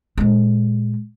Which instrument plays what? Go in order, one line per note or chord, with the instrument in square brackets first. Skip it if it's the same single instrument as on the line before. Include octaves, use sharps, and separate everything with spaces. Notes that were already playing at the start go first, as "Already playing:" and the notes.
[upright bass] A#2 G#3